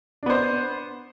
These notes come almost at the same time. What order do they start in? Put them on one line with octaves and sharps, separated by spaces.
D4 B3 C5